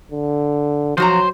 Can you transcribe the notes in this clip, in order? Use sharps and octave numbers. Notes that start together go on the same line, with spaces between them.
D3
F3 F#3 F#4 C5 A#5